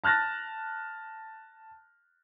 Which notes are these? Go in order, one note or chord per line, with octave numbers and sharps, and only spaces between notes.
A5 F6 F#6 A6 A#6